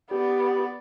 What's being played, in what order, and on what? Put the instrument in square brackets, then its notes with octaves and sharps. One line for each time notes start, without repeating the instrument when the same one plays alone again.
[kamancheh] B3 D5 [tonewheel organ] G4